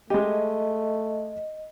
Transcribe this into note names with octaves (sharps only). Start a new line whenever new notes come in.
G#3 A3 G4 D#5